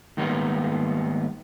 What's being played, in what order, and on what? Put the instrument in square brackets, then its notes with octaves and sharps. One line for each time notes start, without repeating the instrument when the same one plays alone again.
[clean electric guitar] G#2 D#3 G3 A#3 B3